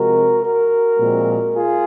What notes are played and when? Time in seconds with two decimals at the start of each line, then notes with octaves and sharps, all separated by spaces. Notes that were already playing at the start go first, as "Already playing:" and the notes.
Already playing: C3 F3 G#3 F#4 A#4
0.44 F#4 A#4
0.99 A#2 F3 G#3 C4
1.54 F4 G#4